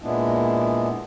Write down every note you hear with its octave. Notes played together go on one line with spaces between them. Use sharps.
A#2 G#3 B3 D4 E4